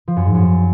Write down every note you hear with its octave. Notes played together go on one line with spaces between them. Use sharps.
F3
F#2
G#2
F#2